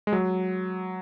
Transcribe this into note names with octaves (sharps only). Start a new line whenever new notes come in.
G#3
F#3